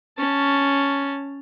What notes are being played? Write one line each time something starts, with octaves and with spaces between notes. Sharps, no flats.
C#4 A5